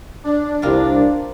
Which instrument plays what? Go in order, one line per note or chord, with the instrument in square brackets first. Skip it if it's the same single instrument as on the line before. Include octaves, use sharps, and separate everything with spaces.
[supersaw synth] D4
[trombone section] C2 [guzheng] C4 F4 A#4